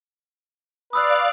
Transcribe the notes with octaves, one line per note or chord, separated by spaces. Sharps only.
B4 D5 F5 D#6 E6 F#6